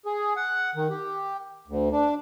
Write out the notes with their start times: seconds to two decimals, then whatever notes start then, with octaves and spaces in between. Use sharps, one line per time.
0.06 G#4
0.36 F#5
0.75 D#3
0.90 G4
1.68 D2
1.92 D4